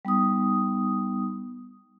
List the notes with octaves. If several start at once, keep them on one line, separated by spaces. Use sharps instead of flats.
G3 B3 D#4 D#6